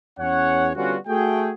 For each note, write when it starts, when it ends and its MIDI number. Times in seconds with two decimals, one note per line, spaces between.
0.19 0.70 40
0.19 0.70 61
0.19 0.70 73
0.19 0.70 78
0.75 0.96 50
0.75 0.96 55
0.75 0.96 59
0.75 0.96 61
0.75 0.96 65
0.75 0.96 66
1.07 1.52 57
1.07 1.52 66
1.07 1.52 68
1.07 1.52 79